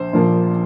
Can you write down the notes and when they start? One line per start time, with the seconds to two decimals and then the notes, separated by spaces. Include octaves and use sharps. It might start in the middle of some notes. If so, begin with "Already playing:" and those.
Already playing: A#1 C5
0.13 A#2 F3 A#3